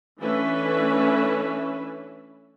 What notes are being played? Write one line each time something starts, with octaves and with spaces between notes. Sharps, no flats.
E3 A3 C#4 D4 B4 E5